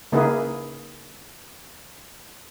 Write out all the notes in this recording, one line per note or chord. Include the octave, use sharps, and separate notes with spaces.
C#3 A#3 D#4 E4 G#4 B4